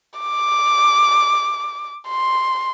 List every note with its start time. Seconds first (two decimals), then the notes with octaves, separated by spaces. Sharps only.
0.19 D6
2.08 C6